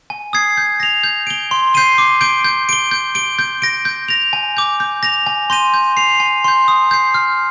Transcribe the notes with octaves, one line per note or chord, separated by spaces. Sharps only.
G#5
D#6 G#6 C7
G6
A#6 F7
G6
D7 G7
C6
G6 C7 D#7 G7
D6
G6 D7 G7
G6
D7 G7
G6
D7 G7
G6
A#6 D7
G6
A#6 F7
G#5
D6 G6
G6
A#6 F7
G#5
C6 G6 A#6 D#7
G6
C7 F7
G#5
C6 G6
D#6
G6 C7
F6